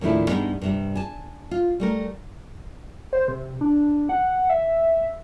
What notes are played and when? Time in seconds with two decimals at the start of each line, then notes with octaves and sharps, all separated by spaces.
0.01 D#2 A2 F3 A3 D4 E4
0.27 G2 D#3 G3 G#3 B3 D#4
0.61 G2 C3 G3
0.95 G#5 A5
1.51 F4
1.80 G3 A3 A#4
3.13 C5
3.28 C3
3.61 D4
4.09 F#5
4.50 E5